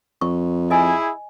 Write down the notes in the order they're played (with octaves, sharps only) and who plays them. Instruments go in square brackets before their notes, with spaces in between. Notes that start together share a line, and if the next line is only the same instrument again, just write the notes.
[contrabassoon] F2 [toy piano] C#6
[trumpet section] E4 G#4 [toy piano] D#5 G#5